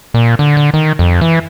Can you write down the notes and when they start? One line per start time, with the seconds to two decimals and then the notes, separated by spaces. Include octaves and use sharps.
0.14 A#2
0.39 D3
0.57 D3
0.74 D#3
0.99 F2
1.21 E3